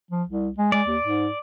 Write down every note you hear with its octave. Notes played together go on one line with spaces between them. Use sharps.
F3
C2
G#3
G#3 D5
D#2
G#2